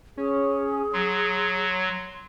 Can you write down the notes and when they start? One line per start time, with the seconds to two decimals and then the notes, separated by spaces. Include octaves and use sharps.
0.17 C#4 G#4
0.93 F#3 C6